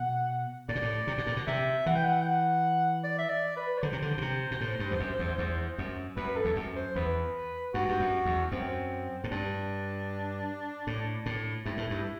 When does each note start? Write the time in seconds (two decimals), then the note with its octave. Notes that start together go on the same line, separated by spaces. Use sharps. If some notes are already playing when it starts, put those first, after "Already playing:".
Already playing: B2 F#5
0.69 A2 D5
0.75 B2
0.82 A2
1.07 C3
1.18 B2
1.27 A2
1.37 B2
1.47 C3 E5
1.86 E3 F#5
1.95 G5
2.03 F#5
2.21 G5
2.26 F#5
3.04 D5
3.18 E5
3.29 D5
3.57 B4
3.78 D5
3.82 D3 C5
3.93 C3
4.02 D3
4.18 B2
4.21 C3
4.51 B2
4.61 A2
4.80 G2
4.91 E2
5.00 F#2
5.19 E2
5.38 E2
5.78 F#2
6.17 F#2 B4
6.36 A4
6.45 E2
6.56 F#2
6.76 C5
6.95 E2 B4
7.74 G2 F#4
7.89 G2
8.00 F#2
8.25 E2
8.52 F#2 C4
9.24 A2
9.31 G2 D4
10.87 A2
11.26 A2
11.65 G2 E4
11.77 A2
11.90 G2